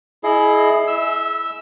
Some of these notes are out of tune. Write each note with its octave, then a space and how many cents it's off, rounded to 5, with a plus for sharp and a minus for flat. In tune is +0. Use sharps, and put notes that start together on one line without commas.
E4 +0 G#4 +25 D#5 -15
E5 -30 E6 +0